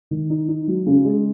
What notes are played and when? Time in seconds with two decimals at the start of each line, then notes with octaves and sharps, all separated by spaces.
0.11 D#3
0.30 D#4
0.48 D#4
0.68 F#3
0.86 C#3
1.05 G#3